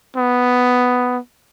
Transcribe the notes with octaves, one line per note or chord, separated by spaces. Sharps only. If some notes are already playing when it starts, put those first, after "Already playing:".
B3